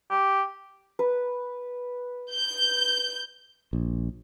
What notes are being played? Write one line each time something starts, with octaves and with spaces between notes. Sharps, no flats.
G4
B4
G6
A#1